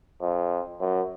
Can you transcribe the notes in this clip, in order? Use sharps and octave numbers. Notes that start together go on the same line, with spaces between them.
F2
F#2